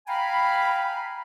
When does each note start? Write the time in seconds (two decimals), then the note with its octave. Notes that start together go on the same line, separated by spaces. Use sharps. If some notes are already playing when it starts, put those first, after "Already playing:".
0.07 F5 G5 G#5 A#5 B5